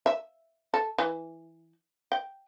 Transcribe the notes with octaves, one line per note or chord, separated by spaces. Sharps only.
E5
A4
E3
G5